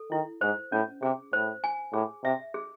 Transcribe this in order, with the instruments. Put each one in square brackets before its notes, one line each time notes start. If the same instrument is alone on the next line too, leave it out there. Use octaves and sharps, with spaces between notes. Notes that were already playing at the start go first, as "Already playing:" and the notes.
Already playing: [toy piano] A4
[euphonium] D#3 [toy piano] E4
[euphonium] G#2 [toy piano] C5
[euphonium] A2 [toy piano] C#4
[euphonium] C3 [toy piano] G#4
[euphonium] A2 [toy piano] C5
[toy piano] G#5
[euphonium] A2 [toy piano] G#4
[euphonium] C3 [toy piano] E5
[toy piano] G#4